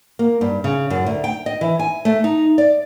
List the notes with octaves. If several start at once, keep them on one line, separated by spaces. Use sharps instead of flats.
A#3
G2
C#3
F#2
D2
G5
D#5
E3
G#5
A3
D#4
D5